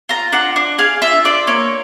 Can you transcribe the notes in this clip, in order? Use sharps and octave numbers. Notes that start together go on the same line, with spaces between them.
F4 A#5
D4 F#5
D4
G#4 F5
F4 E5
D4 D5
A#3 C#5